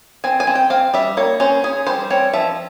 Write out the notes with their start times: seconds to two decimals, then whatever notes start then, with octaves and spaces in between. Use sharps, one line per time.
0.24 C4 G#5
0.40 G#5
0.47 C4
0.55 G5
0.70 C4 F5
0.94 G3 E5
1.17 A#3 C#5
1.40 C#4 C5
1.64 C#4 G#4
1.87 G3 C5
2.10 C4 C#5
2.33 F3 E5